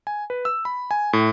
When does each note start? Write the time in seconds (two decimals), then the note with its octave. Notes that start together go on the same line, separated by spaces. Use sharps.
0.07 G#5
0.30 B4
0.45 E6
0.65 B5
0.91 G#5
1.13 A2